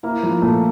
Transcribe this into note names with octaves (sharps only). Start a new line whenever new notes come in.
A#3 E4
F3
A#2 A3